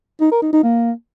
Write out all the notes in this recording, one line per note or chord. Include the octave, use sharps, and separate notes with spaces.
D#4
A#4
D#4
D#4
A#3